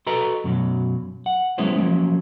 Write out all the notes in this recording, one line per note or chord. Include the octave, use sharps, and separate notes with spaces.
F#4 A4 B4 D#5 A#5
F#2 B2 D3 F#3
F#5
F#3 G#3 B3 C#4 E4 C5
F3 F#3 A#3 C#4